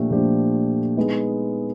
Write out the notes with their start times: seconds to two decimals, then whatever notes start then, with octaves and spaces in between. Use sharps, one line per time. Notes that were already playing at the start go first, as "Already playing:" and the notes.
Already playing: A#2 F3 A3 D4 G4
0.10 A#2 F3 A3 D4 G4
0.97 G#3 B3 D#4